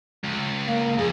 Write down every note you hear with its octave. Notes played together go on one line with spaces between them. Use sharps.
C#2
A#3
F2 G#4